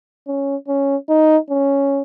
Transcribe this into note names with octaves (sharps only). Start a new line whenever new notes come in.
C#4
C#4
D#4
C#4